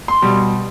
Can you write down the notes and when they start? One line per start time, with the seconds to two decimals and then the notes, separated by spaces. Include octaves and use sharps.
0.08 C6
0.22 B2 G3